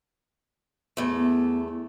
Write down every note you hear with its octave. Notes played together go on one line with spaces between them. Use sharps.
E2 A3
B3